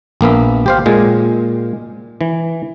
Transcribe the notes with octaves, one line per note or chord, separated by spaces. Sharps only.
A#1 A#3 B3 E5
G4 C5 F5
A#2 G#3
E3